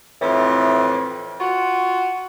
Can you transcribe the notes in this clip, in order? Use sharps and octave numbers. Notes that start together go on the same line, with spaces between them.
F2 A2 E3
F4 F#4